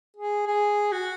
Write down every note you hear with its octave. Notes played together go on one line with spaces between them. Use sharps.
G#4
G#4
F#4